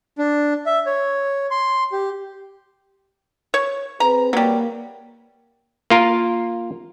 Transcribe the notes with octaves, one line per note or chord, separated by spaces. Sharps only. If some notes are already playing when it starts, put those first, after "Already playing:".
D4
E5
C#5
C6
G4
C#5
C4 G#4 B4 A#5
F#3 G3 A#3
A#3 F4 A#4